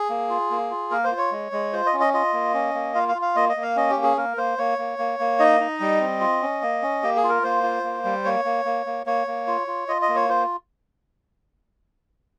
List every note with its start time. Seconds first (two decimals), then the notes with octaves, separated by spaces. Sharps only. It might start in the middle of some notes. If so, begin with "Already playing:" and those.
Already playing: G#4
0.10 A#3
0.29 F4
0.50 A#3
0.71 F4
0.91 A#3 A#4
1.04 C5
1.11 F4
1.18 C#5
1.32 G#3
1.52 G#3
1.73 F4 C5
1.86 D#5
1.93 C#4
2.00 D#5
2.14 F4 D#5
2.33 A#3
2.54 C#4
2.74 A#3
2.95 F4 F5
3.09 F5
3.15 F4
3.22 F5
3.36 A#3 D#5
3.49 D#5
3.57 A#3
3.62 F5
3.76 C#4 D#5
3.90 G4
3.97 A#3
4.03 G#4
4.17 A#3 A#4
4.37 A#3 C5
4.58 A#3 C#5
4.79 A#3
4.99 A#3
5.19 A#3
5.39 D#4 D#5
5.60 D#4
5.80 G3
6.01 C4
6.21 F4
6.42 C#4
6.62 A#3
6.82 C#4
7.03 A#3 G4
7.16 G#4
7.24 F4
7.29 A#4
7.43 A#3 C5
7.63 F4
7.84 A#3
8.05 G3
8.25 A#3 C#5
8.45 A#3
8.65 A#3
8.86 A#3
9.06 A#3 C#5
9.27 A#3
9.47 F4
9.67 F4
9.88 F4 D#5
10.02 D#5
10.09 A#3
10.15 C#5
10.29 F4 C5